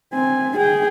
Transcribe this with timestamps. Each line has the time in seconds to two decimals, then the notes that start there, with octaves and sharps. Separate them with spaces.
0.14 C4 G#5
0.57 G#4 G5